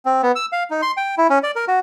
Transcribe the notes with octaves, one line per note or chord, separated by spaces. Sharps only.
C4
B3
E6
F5
D#4
C6
G5
E4
C#4
D5
A#4
F#4